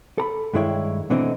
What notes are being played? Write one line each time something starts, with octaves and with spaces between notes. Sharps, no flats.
A4 A#5 B5
G2 D#3 G#3 E4 C#5 G5
B2 D3 E3 A3 C4 D#4